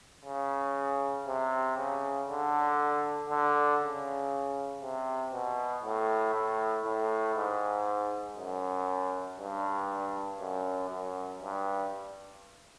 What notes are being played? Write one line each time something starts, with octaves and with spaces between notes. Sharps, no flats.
C#3
C3
C#3
D3
D3
C#3
C3
B2
A2
A2
A2
G#2
F#2
G2
F#2
F#2
G2